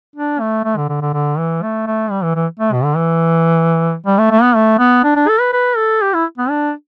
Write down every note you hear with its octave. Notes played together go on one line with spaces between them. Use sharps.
D4
A3
A3
D3
D3
D3
D3
E3
A3
A3
G3
E3
E3
A3
B2
D3
E3
G3
A3
A3
B3
A3
B3
D4
D4
A4
B4
B4
A4
G4
E4
B3
D4